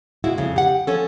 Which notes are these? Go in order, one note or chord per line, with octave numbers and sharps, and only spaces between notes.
A#2 G#3 E4 F#4
F2 C#3
G4 F#5
F3 C#4 A4